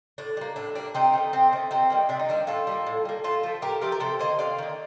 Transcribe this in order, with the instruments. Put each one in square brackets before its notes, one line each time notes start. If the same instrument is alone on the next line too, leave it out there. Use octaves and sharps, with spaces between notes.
[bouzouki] A2 D4
G3 A#3
A2 D4
G3 A#3 D4
C3 C4 D#4
D#3 A3
C3 C4
D#3 A3
C3 C4 D#4
D#3 G3 A#3
C3 D4
D#4
D#3 G3 A#3 D4
A2 F4 A4
G3 A#3
A2
G3 A#3
A2 F4 A4
F3 A3
A2 G4 A#4
F3 A3 G4 A#4
A#4
C3 A4 C5
D#3 A#3 C5 D#5
C3 D5 F5
D#3 A#3